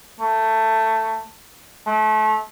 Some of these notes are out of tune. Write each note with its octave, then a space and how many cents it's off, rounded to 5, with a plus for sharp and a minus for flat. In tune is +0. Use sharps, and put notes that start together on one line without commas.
A3 +15
A3 -30